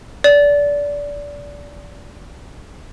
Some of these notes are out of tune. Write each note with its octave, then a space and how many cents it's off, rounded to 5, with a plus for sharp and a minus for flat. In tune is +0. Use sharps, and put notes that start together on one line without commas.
D5 -20